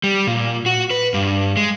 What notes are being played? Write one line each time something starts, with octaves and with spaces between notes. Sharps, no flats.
G3
A#2
F#4
B4
G2
G#3